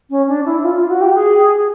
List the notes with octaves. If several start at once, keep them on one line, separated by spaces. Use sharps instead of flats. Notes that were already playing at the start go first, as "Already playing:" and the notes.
C#4
D4
E4
F4
F4
F#4
G4
G#4